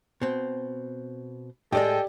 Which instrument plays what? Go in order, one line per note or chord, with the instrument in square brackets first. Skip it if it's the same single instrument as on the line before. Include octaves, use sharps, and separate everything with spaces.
[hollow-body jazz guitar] B2 C4
[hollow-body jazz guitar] A2 G#3 [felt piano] G4 D5 [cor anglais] A4 [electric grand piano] D#5 G5